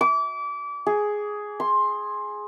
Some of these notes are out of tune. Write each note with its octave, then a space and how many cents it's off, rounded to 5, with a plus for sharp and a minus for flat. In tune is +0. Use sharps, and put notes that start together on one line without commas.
D6 -30
G#4 +5
C6 +15